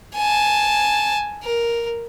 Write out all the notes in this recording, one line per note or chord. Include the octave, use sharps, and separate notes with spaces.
G#5 A5
A#4